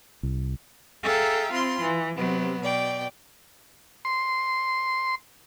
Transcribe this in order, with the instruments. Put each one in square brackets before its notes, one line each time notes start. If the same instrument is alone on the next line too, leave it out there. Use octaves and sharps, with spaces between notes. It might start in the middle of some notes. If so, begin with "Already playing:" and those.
[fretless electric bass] C2
[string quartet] G#4 A4 E5 F5 G5 A#5
C4 F4 B5 C6
E3
C3 F#3 B3
B2 D5 G5
[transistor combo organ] C6